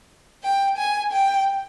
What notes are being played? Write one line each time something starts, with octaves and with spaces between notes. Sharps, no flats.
G5
G#5
G5